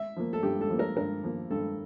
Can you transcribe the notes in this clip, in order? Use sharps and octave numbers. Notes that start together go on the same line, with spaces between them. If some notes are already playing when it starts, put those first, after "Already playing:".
Already playing: E5
F3 A#3
A4
G2 G4
A4
F3 A#3
A#4
G2 A#4
F3 A#3
G2 A4